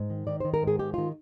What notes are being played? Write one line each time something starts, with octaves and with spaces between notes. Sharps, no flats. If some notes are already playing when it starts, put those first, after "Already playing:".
Already playing: G#2
D#3
D#3 D5
D#3 C5
A#4
G#2
G#4
D#3 G4
D#3 F4